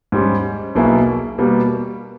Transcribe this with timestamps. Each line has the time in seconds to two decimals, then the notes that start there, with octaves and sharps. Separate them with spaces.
0.12 G#2 G3 C#4
0.75 B1 B2 A#3 E4 G#4
1.38 B2 G3 A#3